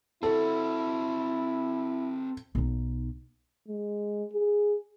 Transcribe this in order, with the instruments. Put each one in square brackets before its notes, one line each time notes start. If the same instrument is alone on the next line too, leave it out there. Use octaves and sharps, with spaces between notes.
[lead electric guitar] C4 F#4 [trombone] E4 [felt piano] A4
[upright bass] B1 D#4
[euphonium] G#3
G#4